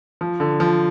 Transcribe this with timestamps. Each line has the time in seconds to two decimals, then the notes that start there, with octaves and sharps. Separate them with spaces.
0.21 F3
0.40 D3
0.60 F3